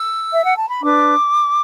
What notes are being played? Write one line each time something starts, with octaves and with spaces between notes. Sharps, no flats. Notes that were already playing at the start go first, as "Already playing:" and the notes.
Already playing: E6
E5
F#5
A5
B5
D4 B4 D6